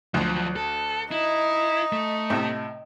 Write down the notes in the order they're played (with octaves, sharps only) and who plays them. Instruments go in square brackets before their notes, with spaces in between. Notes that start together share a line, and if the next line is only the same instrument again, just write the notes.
[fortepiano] D2 [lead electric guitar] F3 F#3
[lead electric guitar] A4
[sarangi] D#4 [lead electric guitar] E4
[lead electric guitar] A3
[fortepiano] A2 C3